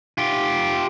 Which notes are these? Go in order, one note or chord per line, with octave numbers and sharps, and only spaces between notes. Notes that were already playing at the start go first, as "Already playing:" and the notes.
F4 G4